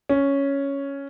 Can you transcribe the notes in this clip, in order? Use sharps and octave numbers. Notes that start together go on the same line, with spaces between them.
C#4